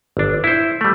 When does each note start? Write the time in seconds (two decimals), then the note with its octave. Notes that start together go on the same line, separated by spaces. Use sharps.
0.17 G1 D4
0.44 E4 C5
0.81 G3 A3